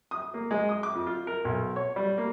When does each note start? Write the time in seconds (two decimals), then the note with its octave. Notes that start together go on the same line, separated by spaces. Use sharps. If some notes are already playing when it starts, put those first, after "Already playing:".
0.11 D#6
0.34 A#3
0.51 G#3
0.69 D#6
0.83 D6
0.95 F2
1.07 F4
1.27 A#4
1.45 B1
1.76 C#5
1.96 G3
2.18 A#3